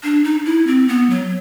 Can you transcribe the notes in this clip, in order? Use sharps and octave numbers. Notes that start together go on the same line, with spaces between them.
D4
D#4
E4
C4
B3
F#3